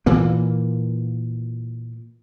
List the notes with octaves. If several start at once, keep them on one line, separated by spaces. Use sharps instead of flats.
A#2 E3 A#3